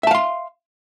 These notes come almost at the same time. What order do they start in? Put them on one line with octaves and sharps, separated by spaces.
E5 A5 F5 C6